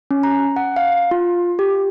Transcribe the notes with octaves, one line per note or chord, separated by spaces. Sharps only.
C#4
A#5
F#5
F5
F4
G4